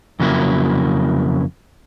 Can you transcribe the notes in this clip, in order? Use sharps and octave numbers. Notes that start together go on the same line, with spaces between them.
F2 C#3 F#3 A#3 E4